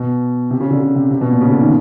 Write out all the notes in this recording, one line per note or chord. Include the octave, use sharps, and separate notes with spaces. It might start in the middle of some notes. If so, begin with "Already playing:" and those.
Already playing: B2
C3
C#3
D3
C#3
C3
C3
B2
A#2
C#3
D3
D#3